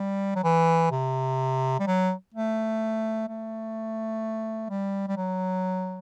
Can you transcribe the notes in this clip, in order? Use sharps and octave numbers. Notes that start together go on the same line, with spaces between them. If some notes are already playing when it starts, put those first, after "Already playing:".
Already playing: G3
F#3
E3
C3
G3
F#3
A3
A3
G3
G3
F#3